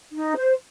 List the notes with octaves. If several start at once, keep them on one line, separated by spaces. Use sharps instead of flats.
D#4
C5